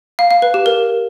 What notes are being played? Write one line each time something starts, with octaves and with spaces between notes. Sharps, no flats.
F5
F5
B4
G4
A#4